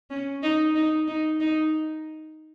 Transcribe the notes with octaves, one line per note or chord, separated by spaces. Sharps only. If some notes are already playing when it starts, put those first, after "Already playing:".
C#4
D#4
D#4
D#4
D#4